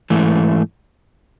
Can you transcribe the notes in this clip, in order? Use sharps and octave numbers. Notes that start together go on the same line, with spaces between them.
G#2 E3 A3